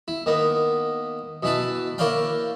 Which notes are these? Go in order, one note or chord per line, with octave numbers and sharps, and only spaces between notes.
E4
D#3 A#3 B3
B2 E3 E4 B4 A5
A#3 E4 C#5 D5 F5 G5